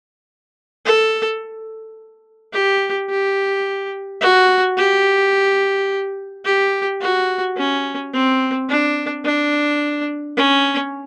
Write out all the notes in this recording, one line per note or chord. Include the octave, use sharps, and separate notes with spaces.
A4
G4
G4
F#4
G4
G4
F#4
C#4
C4
D4
D4
C#4